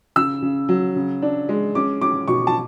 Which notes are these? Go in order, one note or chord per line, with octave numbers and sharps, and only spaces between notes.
C#3 E6
C#3
F#3
C#3
D4
G#3
C#4 D6
C#4 D6
B2 C#6
A5